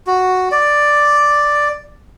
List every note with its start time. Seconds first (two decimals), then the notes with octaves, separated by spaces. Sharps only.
0.07 F#4
0.52 D5